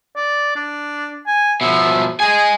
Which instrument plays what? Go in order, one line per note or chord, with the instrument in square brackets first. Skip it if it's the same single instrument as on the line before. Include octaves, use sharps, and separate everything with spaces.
[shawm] D5
D4
G#5
[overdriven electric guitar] B2 F3 [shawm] E5
[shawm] G#4 [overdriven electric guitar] D#5 G#5